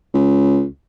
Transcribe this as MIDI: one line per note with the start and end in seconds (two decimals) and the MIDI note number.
0.14 0.65 37